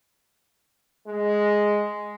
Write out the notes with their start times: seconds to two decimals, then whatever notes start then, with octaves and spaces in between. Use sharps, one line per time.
1.07 G#3